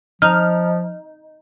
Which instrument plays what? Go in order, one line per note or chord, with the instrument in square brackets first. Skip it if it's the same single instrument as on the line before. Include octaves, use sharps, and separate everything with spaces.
[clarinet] F3 [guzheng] D#4 [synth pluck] F6